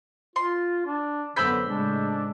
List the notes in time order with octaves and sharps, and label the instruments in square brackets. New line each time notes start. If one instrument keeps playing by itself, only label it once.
[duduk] F4 [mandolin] C6
[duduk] D4
[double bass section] F#2 B3 [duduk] D3 [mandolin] C4 B5 [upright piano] E6 G6 B6
[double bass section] A2 C#3 G#3 [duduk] D4